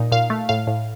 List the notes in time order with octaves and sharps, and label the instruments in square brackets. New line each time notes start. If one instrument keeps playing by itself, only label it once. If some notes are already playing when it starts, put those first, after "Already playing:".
Already playing: [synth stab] A#2 D#4
A#2 F5
A3
A2 F5
A2